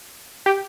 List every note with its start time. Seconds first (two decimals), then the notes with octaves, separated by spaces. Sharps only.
0.46 G4